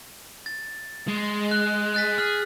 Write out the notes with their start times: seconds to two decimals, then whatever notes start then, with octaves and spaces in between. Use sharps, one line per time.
0.46 A6
1.08 G#3
1.51 F#6
1.94 F#6 A6 B6
2.18 G#4 F6